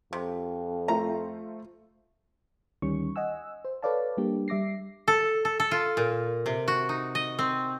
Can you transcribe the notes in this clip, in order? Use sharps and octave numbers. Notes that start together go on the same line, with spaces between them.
F2 C3
A3 F4 C5 A#5
D2 D#3 G3 C#4 C#6
D#5 F#5 G#5 E6
C5
A4 B4 C#5 D5 F5 A5
G3 A#3 D4 G4
G3 E5 D6 A#6 C7
A4
A4
A4
F4
A#2
C3
F#4
D#4
D#5
C4